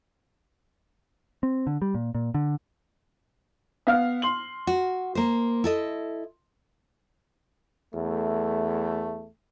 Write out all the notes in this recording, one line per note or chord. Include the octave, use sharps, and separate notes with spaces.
C4
D3
G3
A#2
A#2
D3
B3 F5 F6
C6 F#7
F#4
A#3 C5
E4 A4 D#5
E2 A3